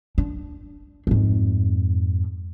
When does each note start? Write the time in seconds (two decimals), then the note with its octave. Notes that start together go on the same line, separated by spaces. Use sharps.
0.18 D4
1.07 F2 G#2